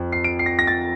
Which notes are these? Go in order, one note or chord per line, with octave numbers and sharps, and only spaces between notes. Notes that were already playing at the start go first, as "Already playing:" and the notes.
Already playing: F2
C7
D7
C7
A#6
A#6
A6